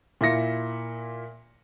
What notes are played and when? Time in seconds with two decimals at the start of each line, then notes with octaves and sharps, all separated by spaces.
0.21 A#2 E4 E5 F5 A#6 C#7